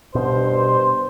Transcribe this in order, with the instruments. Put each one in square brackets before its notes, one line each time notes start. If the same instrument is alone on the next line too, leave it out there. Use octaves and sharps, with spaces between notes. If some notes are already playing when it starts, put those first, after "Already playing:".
[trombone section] G2 C5 [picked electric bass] B2